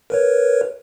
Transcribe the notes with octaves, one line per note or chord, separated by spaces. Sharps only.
A#4 B4 C#5